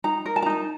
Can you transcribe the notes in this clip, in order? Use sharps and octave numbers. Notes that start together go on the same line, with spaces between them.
D#4 A#5
A#4
A5
A#5
D#4 A5